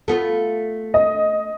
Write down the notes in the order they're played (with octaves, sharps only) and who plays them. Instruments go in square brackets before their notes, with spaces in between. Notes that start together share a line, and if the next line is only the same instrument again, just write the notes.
[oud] A3 B3 F4
[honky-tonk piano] D#5